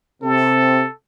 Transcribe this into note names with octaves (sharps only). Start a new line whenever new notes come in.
C3 C4 A4